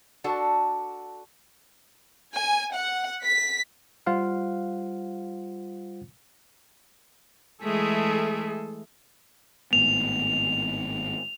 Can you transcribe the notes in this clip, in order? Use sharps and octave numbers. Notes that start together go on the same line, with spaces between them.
D4 F#4 A4
G#5
F#5
B6
G3 F4 C5 F5 F#5
E3 G#3 A3 G#4 A4
G#1 A2 B3 F7